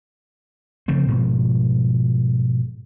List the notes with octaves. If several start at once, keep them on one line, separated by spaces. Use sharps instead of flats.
C#3 F3 A3 C4
G#2 B2 F3